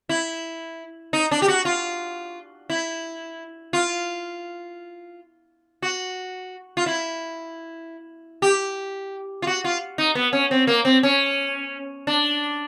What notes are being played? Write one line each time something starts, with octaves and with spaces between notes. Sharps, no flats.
E4
D#4
D4
G4
F#4
F4
E4
F4
F#4
F4
E4
G4
F4
F#4
F4
D#4
B3
C#4
C4
A#3
C4
C#4
D4